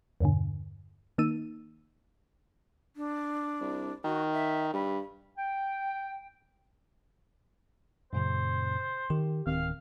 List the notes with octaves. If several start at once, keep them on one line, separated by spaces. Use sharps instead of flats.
E2 G2 B2 D3
D#3 A#3 D#4 E6 D#7
D4
C2
D#3 F#4
E5
G2 B5
G5
F#2 A#2 C#3 C5
D#3 G4
D1 D#3 C4 F5